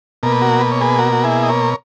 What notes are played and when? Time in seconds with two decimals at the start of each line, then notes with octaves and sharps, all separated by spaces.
0.23 B2 A#3 A#4
0.32 B4
0.41 F#4 A#4
0.61 B4
0.72 C#5
0.81 G#4 B4
0.99 F#4 A#4
1.13 F#4
1.24 E4 G#4
1.43 D#5
1.49 A#4 C#5